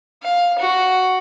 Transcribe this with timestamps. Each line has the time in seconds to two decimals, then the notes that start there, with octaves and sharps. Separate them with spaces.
0.23 F5
0.59 F#4